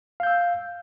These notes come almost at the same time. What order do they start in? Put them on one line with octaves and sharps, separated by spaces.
F5 G6 E6